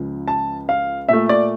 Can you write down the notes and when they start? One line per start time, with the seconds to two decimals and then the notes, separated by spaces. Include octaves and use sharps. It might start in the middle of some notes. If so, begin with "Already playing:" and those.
Already playing: C#2 C#3 F3
0.28 A5
0.69 F5
1.09 A#2 A3 E5
1.29 D5